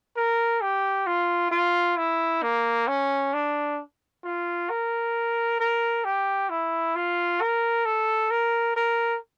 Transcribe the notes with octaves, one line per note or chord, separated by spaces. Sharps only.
A#4
G4
F4
F4
E4
A#3
C#4
D4
F4
A#4
A#4
G4
E4
F4
A#4
A4
A#4
A#4